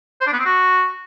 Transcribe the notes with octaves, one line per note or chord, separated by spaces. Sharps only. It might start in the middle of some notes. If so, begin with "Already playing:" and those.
C5
D4
B3
C4
F#4